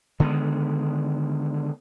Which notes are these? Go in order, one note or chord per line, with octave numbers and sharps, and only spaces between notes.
D3 D#3 G#3 B3